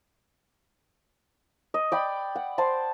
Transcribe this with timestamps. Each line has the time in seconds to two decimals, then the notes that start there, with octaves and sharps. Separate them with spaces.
1.74 D#5
1.92 D5 G5 B5
2.35 F#5
2.58 C5 A5 C6